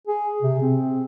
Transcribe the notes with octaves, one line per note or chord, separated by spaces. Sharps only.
G#4
C3
C4